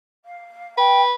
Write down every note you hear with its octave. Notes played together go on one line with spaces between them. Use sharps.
F5
B4 G5